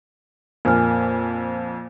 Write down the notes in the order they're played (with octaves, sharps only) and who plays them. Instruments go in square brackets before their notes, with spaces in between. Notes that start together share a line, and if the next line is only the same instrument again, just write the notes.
[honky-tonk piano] F2 [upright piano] A#2 A#3 [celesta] G#5 F6